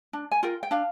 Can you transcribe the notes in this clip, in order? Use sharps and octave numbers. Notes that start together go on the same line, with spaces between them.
D4
G#5
F4 A#4 G5
G5
D4 F5